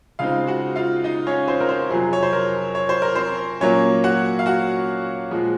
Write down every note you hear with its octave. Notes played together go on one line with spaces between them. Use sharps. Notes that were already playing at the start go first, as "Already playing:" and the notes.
C#3 G#3 C4 D#4 F4 F5
F#4 F#5
F4 F5
D#4 D#5
C#4 C#5
C4 C5
A#4
C4 C5
F2 C3 F#3 G#4
C#5
C5
A#4
C#5
C5
A#4
C4 C5
A#2 F#3 A#3 C#4 C#5
F#4 F#5
F5
F#4 F#5
A#2 F3 G#3